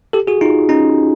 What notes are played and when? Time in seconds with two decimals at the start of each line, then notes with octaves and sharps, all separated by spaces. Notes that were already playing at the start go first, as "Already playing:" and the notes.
0.13 G4 A4
0.27 F#4 G#4
0.41 D#4 F4
0.69 C#4 D#4